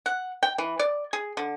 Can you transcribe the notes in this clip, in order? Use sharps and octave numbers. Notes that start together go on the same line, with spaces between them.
F#5
G5
E3
D5
G#4
D3